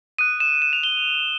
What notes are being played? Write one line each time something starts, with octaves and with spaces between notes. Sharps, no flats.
D#6 F#6 D#7
E7
E7
F7
G7